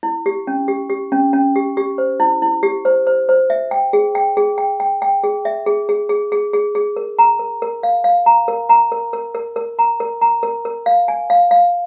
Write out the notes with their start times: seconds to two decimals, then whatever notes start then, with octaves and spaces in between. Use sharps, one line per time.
0.03 E4
0.26 G4
0.47 C#4
0.68 G4
0.90 G4
1.12 C#4
1.33 C#4
1.56 G4
1.77 G4
1.98 C5
2.20 E4
2.42 E4
2.63 G4
2.85 C5
3.07 C5
3.29 C5
3.50 E5
3.71 G5
3.93 G#4
4.15 G5
4.37 G#4
4.58 G5
4.80 G5
5.02 G5
5.24 G#4
5.45 E5
5.66 G#4
5.89 G#4
6.09 G#4
6.32 G#4
6.53 G#4
6.75 G#4
6.96 A#4
7.19 A#5
7.39 A#4
7.62 A#4
7.83 F5
8.04 F5
8.26 A#5
8.48 A#4
8.69 A#5
8.92 A#4
9.13 A#4
9.35 A#4
9.56 A#4
9.79 A#5
10.00 A#4
10.21 A#5
10.43 A#4
10.65 A#4
10.86 F5
11.08 G#5
11.30 F5
11.51 F5